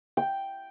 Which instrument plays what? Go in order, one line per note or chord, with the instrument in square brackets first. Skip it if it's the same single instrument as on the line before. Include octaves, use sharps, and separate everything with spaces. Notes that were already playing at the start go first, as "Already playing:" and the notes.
[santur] G5